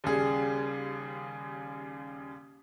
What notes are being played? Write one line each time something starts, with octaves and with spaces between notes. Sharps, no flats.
D#2 C#3 G3 G#4